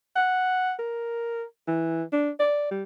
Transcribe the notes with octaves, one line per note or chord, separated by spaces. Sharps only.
F#5
A#4
E3
D4
D5
G3